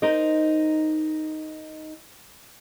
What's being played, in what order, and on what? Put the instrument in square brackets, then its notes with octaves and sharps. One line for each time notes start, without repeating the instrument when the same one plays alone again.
[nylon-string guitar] D#4 A#4 C5 D#5